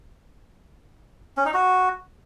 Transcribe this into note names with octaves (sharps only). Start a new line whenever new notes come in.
C#4
D#4
F#4